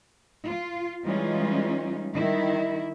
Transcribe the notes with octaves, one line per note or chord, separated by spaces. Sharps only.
F4
E3 G3 G#3 C#4 D#4 F4
D#3 G3 E4